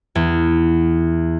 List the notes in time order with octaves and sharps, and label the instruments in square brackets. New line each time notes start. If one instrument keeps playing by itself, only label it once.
[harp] E2